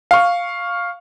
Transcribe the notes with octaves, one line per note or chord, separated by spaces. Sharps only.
F5 C#6